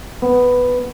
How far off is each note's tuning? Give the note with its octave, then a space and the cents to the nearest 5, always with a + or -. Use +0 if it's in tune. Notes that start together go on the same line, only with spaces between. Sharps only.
B3 +0